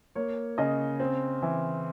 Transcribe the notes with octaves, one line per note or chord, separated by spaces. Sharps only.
A#3 C#5
C#3 D#5
C4
E3